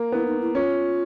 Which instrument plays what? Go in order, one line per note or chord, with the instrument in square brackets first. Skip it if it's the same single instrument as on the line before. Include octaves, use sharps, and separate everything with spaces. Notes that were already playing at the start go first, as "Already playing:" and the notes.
Already playing: [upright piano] A#3
[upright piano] B3 [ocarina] E4
[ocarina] D#4
E4
[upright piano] C#4 [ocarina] F4